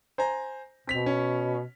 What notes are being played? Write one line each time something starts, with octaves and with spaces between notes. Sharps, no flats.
C5 G#5 A#5
B2 C4 B6 F7
C#4